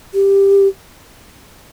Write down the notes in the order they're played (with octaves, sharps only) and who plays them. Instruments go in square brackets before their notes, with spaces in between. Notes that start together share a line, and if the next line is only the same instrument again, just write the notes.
[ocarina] G4